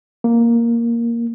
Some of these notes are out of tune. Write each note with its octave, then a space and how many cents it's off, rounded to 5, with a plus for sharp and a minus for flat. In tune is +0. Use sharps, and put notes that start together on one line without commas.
A#3 +0